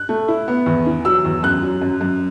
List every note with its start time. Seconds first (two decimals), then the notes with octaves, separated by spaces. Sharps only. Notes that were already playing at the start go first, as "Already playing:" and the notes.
Already playing: F#6
0.09 A3
0.28 E4
0.48 B3
0.66 E2
0.86 E3
1.05 F#3 E6
1.25 E2
1.43 F#2 F#6
1.63 F#3
1.82 F#2
2.01 F#2